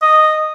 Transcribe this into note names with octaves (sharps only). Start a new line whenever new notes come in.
D#5